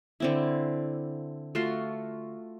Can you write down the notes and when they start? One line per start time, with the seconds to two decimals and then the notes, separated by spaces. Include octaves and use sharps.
0.20 D3 C4 E4
1.55 A3 F4 F#4 C6